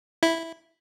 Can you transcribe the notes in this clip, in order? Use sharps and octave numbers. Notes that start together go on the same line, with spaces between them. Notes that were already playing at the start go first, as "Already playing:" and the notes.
E4